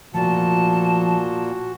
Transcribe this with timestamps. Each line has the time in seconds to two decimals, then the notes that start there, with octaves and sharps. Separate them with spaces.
0.14 A#2 F3 A3 F#4 A5